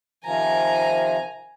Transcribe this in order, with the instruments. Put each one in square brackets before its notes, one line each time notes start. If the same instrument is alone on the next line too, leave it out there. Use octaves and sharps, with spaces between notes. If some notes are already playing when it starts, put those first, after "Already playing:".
[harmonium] C3 D#3 F3 [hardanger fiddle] G#5 A#5